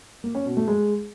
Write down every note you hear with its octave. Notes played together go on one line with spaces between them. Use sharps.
A#3
C#4
B2
A3
G#3